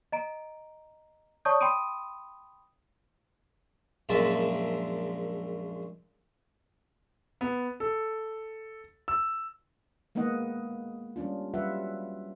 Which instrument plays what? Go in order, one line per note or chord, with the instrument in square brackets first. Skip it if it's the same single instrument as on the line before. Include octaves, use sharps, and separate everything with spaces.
[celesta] D#5 A#5 D7
C#5 D5 A5 C#6 D#6 G6
G5 B5 C6 D#6 D7 D#7
[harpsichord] A#1 F#2 A#2 G#3 E5 A5
[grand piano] B3
A4
E6
[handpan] G#3 A#3 B3 D#4 D#5 F#5
G3 C#4 D4 F4
F#3 G3 F4 B4 E5 F#5